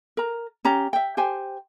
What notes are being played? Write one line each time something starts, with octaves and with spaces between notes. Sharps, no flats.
A#4 A#5
C#4 G4 A#5
E5 G5
G4 C5 G5 G#5